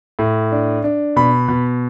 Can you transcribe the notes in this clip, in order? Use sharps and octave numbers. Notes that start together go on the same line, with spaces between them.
A2
D4
D4
B2 B5
B2